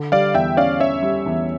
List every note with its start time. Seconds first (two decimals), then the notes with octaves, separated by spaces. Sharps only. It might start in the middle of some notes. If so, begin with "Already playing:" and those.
Already playing: D3
0.12 G3 D5 F5
0.34 E2 E5 G5
0.57 C#4 D5 F5
0.80 C#4 C#5 E5
1.03 G3
1.26 E2